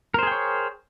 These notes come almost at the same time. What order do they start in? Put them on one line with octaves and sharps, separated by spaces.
A#4 C5 G#4 G5 C#5